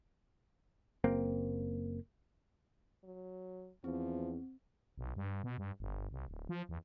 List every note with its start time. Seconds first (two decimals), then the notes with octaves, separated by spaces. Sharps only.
1.04 F#1 A#3 C4
3.04 F#3
3.84 E2 F3 C4
4.98 B1
5.16 G2
5.44 B2
5.58 G2
5.80 G1
6.11 C2
6.28 D1
6.49 F3
6.69 E2